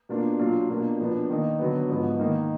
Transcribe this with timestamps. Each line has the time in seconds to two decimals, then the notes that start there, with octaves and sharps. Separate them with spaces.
0.09 B2 A#3 D4 F4
0.39 A#2 F#3 D4 F4
0.69 B2 A#3 D4 F4
1.00 A#2 F3 B3 D4
1.29 D#3 A#3 D#4
1.59 D3 F#3 B3
1.89 G#2 F3 B3
2.19 D#3 A#3 D#4